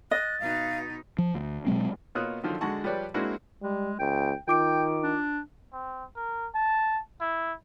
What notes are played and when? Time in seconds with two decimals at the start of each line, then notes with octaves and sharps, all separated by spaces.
0.11 D#5 F#6 A6
0.40 B2 D#4 F5
1.18 F3
1.34 D2
1.67 B2 F#3 G#3 C4
2.15 B2 A#3 F4 C#5 D#6 F#6
2.43 D3 D#3 F3 F#3 F4
2.61 D3 G#3 F#4 F#5 A5 C#6
2.83 F3 G3 G4 B4 C#5 D5
3.14 G#3 A#3 C4 D4 E4 F#4
3.62 G3 G#3
3.99 C#2 G5
4.48 D#3 F4 G5 D6 D7
5.03 D4
5.73 C4
6.16 A#4
6.54 A5
7.21 E4